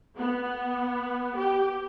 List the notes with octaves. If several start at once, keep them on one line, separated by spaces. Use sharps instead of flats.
B3
G4